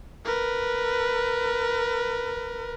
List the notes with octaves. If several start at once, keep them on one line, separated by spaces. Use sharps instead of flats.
A#4 B4